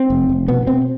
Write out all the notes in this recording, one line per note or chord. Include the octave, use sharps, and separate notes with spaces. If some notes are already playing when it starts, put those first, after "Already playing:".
Already playing: C4
F1
F1
B2 B3
B2 C4